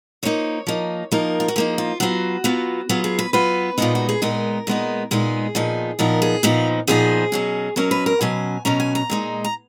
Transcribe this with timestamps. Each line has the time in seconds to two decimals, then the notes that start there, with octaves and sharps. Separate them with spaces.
0.23 F3 A#3 D#4 C#5
0.67 F3 A#3 D#4
1.12 F3 A#3 D#4 A#4
1.40 F4
1.48 F#4
1.56 F3 A#3 D#4 G#4
1.78 F4
2.00 F#3 B3 F4 F#4
2.44 F#3 B3 F4
2.89 F#3 B3 F4 G#4
3.04 G#4
3.19 B4
3.33 F#3 B3 F4 B4
3.78 A#2 G#3 B3 D#4 F4
3.95 F#4
4.09 G#4
4.22 A#2 G#3 B3 D#4 A#4
4.67 A#2 G#3 B3 D#4
5.11 A#2 G#3 B3 D#4 G#4
5.55 A#2 F3 B3 D#4
5.99 A#2 F3 B3 D#4 A#4
6.22 G#4
6.43 A#2 F3 B3 D#4 F4
6.87 A#2 F3 B3 D#4 G#4
7.32 B2 F#3 C#4
7.76 B2 F#3 C#4 A#4
7.91 B4
8.06 A#4
8.21 B2 F#3 C#4 G#5
8.65 B2 F#3 C#4 A#5
8.80 G#5
8.95 A#5
9.10 A#2 G#3 D#4
9.44 A#5